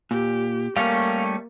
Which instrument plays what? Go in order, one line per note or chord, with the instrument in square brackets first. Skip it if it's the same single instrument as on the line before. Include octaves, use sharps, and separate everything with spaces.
[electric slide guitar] A#2 [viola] G4
[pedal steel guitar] G3 A3 C#4 [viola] A#3 [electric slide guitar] F5